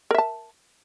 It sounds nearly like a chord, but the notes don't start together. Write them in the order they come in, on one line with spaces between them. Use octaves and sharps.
A#4 E5 A5